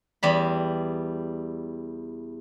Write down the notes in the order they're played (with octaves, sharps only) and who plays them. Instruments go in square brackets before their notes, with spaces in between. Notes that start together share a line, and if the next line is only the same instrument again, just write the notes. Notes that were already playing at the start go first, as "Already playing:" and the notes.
[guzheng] E2 G3 B5